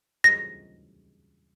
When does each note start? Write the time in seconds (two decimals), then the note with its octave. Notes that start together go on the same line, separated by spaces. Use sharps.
0.24 A#6